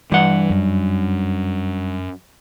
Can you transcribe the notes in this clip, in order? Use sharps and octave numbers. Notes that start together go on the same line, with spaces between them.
G2 E3 F#5
F#2